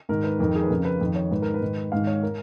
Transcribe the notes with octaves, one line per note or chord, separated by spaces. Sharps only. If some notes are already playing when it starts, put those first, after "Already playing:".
G#2 D#3 A#4
B4
F2 D#3 A#4
G#4
B4
F2 C#3 A#4
B4
F2 D#3
C#5
G#2 D#3 B4
A#4
B4
G#2 D#3
G#2 D#3 F5
C#5
A#4